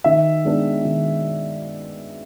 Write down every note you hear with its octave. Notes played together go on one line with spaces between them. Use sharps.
D#3 E5
G#3 B3 D4
D#3